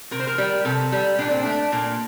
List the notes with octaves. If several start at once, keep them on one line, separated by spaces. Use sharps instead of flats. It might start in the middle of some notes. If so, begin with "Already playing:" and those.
C3 A#4
C5
A#4
G3
C3 A4
G3
A#2 D4
C4
A3 D4
A#2 A#3